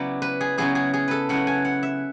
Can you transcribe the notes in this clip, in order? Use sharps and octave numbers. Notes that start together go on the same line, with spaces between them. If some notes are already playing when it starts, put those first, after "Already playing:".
Already playing: C#3 F#3 B3 E4 D5
B4
G#4
C#3 F#3 B3 E4 G#4
G#4
G#4
A4 B4
C#3 F#3 B3 E4 F#5
G#5
F#5
E5